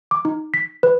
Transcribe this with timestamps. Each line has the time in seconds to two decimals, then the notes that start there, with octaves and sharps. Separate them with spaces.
0.11 D6
0.25 D#4
0.54 B6
0.83 B4